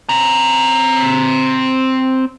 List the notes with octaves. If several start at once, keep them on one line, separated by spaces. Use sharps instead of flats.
C4 A#5